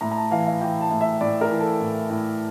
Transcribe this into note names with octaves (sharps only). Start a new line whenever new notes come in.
A2 A#5
A#5
A5
E3 F5
F5
E3 G5
A5
A2
E5
A2 D5
A#4
E3
A4
A2
A2